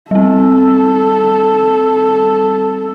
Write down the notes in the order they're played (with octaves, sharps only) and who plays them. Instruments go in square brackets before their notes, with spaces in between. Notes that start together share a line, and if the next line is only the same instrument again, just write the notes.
[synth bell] G3 C4 [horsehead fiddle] A4